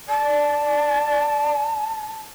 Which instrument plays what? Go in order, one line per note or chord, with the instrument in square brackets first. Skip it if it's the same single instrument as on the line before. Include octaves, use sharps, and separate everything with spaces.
[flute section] D5 [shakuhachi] A5